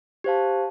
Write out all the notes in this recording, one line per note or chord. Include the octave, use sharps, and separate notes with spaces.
G4 C5 F5 A5